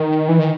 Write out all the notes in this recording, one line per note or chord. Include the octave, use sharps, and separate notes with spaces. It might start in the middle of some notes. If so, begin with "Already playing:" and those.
Already playing: D#3
E3
D#3